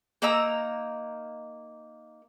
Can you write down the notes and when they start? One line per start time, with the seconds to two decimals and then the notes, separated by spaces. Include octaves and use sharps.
0.22 A#3 D#4 A#5 E6